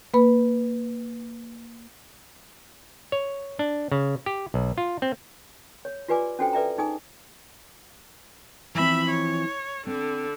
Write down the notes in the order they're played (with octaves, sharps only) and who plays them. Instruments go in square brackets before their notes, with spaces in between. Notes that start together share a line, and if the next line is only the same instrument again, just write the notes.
[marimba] A#3 B4 B5
[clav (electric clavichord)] C#5
D4
C#3
G4
B1
F4
C4
[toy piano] C#5
F4 G4 B4 D5 G#5 D6
C#4 D4 F#4 A4 C5 G5
A4 B4 D5 E5 G5 A#5
D#4 G#4 G#5 D#6
[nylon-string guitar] E3 F3 C4 [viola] E5 B5
[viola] C#5
[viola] D3 [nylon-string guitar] C4